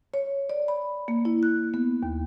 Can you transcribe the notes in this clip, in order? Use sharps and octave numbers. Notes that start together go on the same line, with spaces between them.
C#5
D5
B5
A#3
E4
F#6
B3
D#2